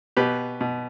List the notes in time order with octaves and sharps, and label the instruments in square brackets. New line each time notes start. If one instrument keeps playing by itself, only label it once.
[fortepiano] B2 G4 B4
B2